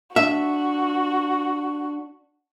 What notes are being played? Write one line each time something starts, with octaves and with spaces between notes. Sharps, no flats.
D4 F#4 E5